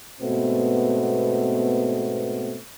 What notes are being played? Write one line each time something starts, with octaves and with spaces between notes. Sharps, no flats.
G#2 B2 A3 B3 C4